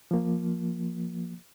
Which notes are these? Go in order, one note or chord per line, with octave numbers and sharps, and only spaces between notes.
F3 A#3